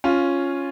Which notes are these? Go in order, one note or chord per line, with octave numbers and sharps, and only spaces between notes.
C#4 F4